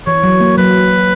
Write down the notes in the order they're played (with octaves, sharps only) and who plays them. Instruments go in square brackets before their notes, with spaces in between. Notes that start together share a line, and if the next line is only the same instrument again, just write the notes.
[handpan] E3 [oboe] C#5
[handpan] F#3
A#3
[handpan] F#3 [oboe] B4